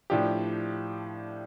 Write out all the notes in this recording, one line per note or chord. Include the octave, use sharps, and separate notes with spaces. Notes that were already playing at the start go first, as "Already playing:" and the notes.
A2 F3 D4 G4